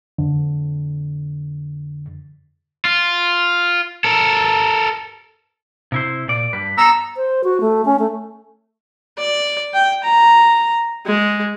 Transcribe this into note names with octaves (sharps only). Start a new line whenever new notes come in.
F2 D3
F4
A4 A#4
C3 E4 C5
A#2 D5
G2 B4
B3 A4 A#5 E6
C5
F#4
A3
C#4
A3
D5
G5
A#5
G#3